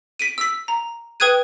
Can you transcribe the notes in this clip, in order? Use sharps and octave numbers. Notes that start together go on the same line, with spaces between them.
B6 D7 D#7
E6 B6
A#5
B4 G5 D#6 F#6 G#6 D#7